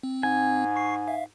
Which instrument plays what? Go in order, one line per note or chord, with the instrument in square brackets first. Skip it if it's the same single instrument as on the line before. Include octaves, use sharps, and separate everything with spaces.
[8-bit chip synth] C4
[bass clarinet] G#2 [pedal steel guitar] G#5
[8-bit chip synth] C#6 C7
E5 F5